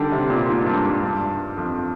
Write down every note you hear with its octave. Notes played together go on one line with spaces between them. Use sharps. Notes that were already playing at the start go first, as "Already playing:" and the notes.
Already playing: D3 D#3 G3
C3
A#2
G#2
G2
G2
G2
F2